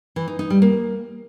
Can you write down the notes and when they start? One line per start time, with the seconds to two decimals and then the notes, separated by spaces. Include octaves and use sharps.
0.16 E3
0.28 D#4
0.39 D#4
0.50 G3
0.62 A#3